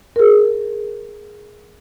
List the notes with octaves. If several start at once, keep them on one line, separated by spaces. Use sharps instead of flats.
G#4 A#4